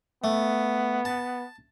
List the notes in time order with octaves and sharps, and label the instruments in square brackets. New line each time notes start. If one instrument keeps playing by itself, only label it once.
[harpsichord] A3 [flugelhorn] B3
[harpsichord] A5